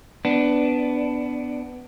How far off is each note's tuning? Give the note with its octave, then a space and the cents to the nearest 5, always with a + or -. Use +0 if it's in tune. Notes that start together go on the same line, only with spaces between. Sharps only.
B3 +15 D4 -5